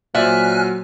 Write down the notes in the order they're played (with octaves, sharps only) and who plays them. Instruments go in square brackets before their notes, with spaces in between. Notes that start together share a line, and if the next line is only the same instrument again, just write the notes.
[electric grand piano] A#2 C5 [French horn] F#3 [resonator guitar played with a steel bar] D5 E5 [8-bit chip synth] G#5 F6 F#6